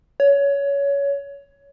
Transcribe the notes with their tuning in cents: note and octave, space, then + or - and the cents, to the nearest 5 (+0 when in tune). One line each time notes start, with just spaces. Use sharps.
C#5 +20